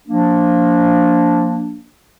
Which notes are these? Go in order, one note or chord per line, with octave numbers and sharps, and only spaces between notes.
F3 A#3 D4